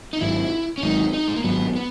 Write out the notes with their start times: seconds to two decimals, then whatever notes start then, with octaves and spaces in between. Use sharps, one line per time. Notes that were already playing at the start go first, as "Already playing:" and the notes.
0.13 D#4
0.21 G#1 G#2 F#3 E4
0.78 C#4
0.83 G#1 G#2 F#3 D#4
1.13 D#4
1.28 G#3
1.36 A#3
1.44 G#1 G#2 F#3 B3
1.75 B3